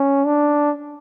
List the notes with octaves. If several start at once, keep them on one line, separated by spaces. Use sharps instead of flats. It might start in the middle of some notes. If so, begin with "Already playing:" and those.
Already playing: C#4
D4